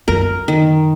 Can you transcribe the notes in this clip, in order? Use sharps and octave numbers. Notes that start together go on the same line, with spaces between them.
F#2 A#4
D#3